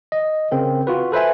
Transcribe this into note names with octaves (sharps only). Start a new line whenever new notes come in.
D#5
C#3 C4 A#4
F4 F#4 B4
A4 B4 C5 E5 G#5